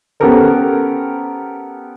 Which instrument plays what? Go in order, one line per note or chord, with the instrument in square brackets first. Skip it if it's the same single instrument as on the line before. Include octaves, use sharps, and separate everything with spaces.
[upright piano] B3 C#4 G4 A4 A#4 C5